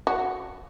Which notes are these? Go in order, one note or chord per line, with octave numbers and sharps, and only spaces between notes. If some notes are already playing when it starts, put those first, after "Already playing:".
F#4